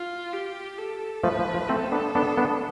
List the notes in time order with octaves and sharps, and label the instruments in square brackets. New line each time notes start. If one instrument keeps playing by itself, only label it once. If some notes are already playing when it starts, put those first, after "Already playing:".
Already playing: [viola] F4
G4
A4
[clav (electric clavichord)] F3 A3 [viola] B4
[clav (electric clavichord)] F3
F3
[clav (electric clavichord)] A3 C4 [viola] A4
[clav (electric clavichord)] B3 D4
B3 D4
B3 D4